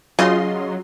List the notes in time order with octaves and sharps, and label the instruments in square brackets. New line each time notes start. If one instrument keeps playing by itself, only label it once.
[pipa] C#3 [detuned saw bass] F#3 [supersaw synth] F4 D#5 C6